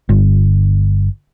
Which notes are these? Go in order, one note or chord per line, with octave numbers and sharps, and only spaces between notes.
G1